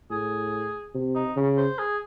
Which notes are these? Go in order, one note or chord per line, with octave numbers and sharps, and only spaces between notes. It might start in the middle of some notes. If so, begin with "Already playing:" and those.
A2 G#4
C3
D#4
C#3
C5
G#4